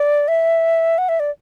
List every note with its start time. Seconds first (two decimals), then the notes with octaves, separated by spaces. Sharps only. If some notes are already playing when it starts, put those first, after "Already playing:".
Already playing: D5
0.28 E5
0.98 F#5
1.09 E5
1.20 D5